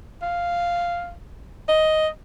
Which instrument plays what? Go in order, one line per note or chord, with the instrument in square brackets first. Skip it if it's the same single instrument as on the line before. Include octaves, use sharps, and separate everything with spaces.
[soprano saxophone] F5
D#5